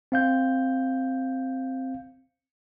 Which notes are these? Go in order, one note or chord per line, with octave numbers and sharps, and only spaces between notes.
C4 F5 G6